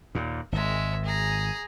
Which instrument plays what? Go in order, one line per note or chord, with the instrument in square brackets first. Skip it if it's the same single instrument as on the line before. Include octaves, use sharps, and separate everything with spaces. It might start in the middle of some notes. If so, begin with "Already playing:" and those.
[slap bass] D#2 A#2
[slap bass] G#1 [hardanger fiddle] G#3 E5
[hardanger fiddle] G#4 A#5